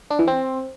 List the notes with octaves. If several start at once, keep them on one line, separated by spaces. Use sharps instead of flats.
D4
E3
C4